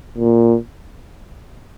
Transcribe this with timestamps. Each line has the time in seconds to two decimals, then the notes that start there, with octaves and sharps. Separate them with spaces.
0.18 A#2